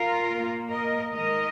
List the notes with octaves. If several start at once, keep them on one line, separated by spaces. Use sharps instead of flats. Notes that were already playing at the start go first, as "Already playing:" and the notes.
Already playing: F4 A#4
A#2 A#3
A#4 D#5
D#3 G#3 A#4 D#5